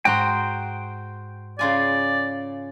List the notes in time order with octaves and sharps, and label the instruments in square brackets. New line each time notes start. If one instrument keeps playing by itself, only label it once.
[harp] G#2 D#6 [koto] F#4 A#5 [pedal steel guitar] G5 C6
[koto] C#3 F4 G#5 [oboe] D5